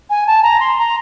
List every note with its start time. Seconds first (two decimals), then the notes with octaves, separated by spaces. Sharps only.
0.10 G#5
0.27 A5
0.43 A#5
0.60 C6
0.78 A#5